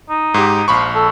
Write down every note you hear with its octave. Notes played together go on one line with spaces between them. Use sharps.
D#4
G#2 G4
A#1 F3 B5 C#6
A4